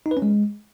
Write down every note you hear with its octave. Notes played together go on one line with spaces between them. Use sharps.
D#4
B4
C#4
G#3